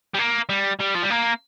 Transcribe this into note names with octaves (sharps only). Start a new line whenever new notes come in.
G3
A#3
G3
G3
F3
G3
A#3